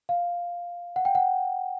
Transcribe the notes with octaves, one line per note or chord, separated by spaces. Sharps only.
F5
F#5
G5
F#5